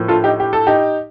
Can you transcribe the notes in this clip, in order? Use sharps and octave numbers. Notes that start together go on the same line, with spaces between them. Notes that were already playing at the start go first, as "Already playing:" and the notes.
Already playing: A2 F3 A#3
F4 A4
D#4 G4
G4
A4
D#4 G4